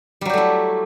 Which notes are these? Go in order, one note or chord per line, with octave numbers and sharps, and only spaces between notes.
F#3 G3 A3 E4 G4